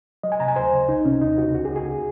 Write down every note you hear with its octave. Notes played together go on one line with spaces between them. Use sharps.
F#3 D#5
G#5
C3 A#5
G#5
D#2 C5
C#3
C2 D#4
C3 C#4
D#2 D#4
C#3 F#4
C#2 F#4
G#4
C#3
G#4